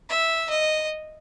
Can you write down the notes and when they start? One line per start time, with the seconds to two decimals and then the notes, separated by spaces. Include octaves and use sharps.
0.10 E5
0.50 D#5